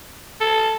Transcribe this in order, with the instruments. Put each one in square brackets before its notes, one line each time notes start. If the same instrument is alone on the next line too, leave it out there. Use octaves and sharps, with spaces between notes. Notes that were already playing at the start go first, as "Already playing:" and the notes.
[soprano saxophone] A4